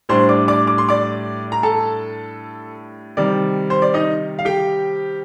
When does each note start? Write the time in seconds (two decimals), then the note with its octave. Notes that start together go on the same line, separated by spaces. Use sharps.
0.09 A2 G3 D4 C5 C6
0.29 D5 D6
0.48 D5 D6
0.67 D6
0.78 C6
0.89 D5 D6
1.52 A#5
1.63 A4 A5
3.17 C3 D#3 G3 D5
3.70 C5
3.82 D5
3.94 D#4 D#5
4.39 F5
4.45 G4 G5